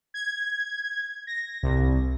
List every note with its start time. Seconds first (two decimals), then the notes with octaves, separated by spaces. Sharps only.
0.14 G#6
1.27 A#6
1.63 C2